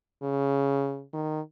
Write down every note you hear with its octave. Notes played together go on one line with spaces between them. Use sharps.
C#3
D#3